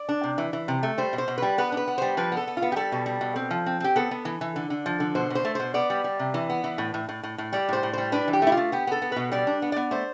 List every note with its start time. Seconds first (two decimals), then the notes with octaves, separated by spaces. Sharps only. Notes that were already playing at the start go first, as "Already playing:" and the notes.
Already playing: D5
0.09 D4
0.23 C3
0.38 E3
0.53 E3
0.68 C3
0.83 A3
0.98 G3 C5
1.13 B2
1.18 C5
1.28 B2
1.38 G3 B4
1.58 B3 B4
1.72 D4
1.77 B4
1.88 B3
1.98 G3 C5
2.17 F3 B4
2.32 B3
2.37 A4
2.47 B3
2.57 F4
2.62 B3
2.72 G4
2.76 G3 A4
2.92 B2
3.06 G3
3.21 B2
3.36 C4
3.51 F3
3.66 C4
3.80 C4 G4
3.96 B3 A4
4.11 B3
4.25 E3
4.41 E3
4.56 D3
4.70 D3
4.86 F3
5.00 D3
5.15 B2 C5
5.30 B2 C5
5.45 A3
5.55 B2 C5
5.74 B3 D5
5.90 G3
6.04 G3
6.19 C3
6.34 E3
6.50 B3
6.64 E3
6.78 A2
6.94 A2
7.09 A2
7.23 A2
7.38 A2
7.53 G3 D5
7.69 A2 C5
7.83 A2
7.93 G3 C5
8.12 D4 B4
8.28 E3
8.33 G4
8.42 A3 E4
8.52 F4
8.57 A3
8.72 B3 G4
8.87 B3 A4
9.02 B3
9.12 B2 B4
9.31 G3 D5
9.47 D4
9.62 B3
9.72 B3 D5
9.91 A3 C5